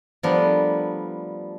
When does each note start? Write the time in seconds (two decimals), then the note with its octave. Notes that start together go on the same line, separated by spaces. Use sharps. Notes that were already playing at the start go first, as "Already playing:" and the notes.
0.23 F3 G3 A3 B3 D4 A#4